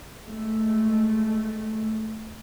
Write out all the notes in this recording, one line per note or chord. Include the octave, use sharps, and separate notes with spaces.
G#3 A3